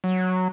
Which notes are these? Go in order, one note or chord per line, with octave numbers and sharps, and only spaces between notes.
F#3